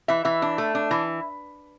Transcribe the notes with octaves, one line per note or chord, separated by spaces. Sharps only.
E3 E5
E3 E5
D4
A3
D4
E3